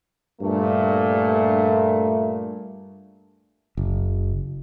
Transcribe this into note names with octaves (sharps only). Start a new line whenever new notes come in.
G2 A#2 A3
F#1